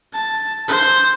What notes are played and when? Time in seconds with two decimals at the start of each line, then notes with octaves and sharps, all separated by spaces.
0.13 A5
0.68 C5